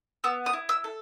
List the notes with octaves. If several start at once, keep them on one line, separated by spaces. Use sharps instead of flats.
B3 E6
D#6
E4
E6
A4